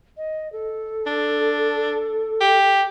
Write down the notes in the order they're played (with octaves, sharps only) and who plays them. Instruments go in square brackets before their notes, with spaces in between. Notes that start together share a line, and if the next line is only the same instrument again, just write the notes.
[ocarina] D#5
A4
[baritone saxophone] D4
G4